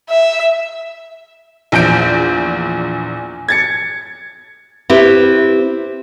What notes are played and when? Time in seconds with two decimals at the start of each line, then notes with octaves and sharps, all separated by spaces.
0.10 E5
1.72 A#1 E2 G6 D7
3.48 G#6 A6 C#7
4.90 C4 E4 G4 B4